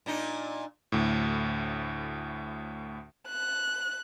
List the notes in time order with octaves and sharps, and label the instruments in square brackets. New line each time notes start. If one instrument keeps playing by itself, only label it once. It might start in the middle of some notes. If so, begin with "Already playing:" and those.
[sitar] A#2 D4 D#4
[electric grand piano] D2 A2
[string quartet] F#6